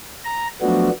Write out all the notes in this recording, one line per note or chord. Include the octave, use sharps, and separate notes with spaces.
A#5
F3 F#3 A3 B3 D4 F#4